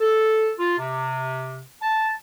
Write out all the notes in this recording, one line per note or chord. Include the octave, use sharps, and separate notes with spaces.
A4
F4
C3
A5